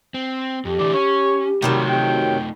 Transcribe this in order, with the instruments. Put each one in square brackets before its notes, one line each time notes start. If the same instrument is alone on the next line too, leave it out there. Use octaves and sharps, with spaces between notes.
[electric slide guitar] C4
[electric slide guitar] F2 [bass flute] G4
[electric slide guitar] D3 E3 A3 [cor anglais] D5
[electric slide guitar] C#4 [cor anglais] C#5
[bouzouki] C3 D#3 F#3 [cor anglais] G3 [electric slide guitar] A3 D#4 F4
[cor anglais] G5